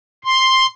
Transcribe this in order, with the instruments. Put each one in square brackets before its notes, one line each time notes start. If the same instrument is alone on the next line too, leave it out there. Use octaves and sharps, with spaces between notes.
[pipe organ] C6